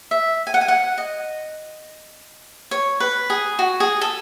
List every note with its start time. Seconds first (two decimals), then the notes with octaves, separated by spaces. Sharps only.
0.11 E5
0.47 G#5
0.54 F#5
0.61 G#5
0.68 F#5
0.98 D#5
2.71 C#5
3.00 B4
3.30 G#4
3.59 F#4
3.80 G#4
4.01 A4